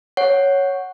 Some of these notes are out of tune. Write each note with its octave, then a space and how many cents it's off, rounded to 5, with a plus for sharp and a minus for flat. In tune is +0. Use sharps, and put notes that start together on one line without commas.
C#5 +0 F#5 +0